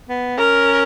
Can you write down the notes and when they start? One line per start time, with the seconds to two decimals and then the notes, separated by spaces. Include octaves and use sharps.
0.09 B3
0.38 C#4 A#4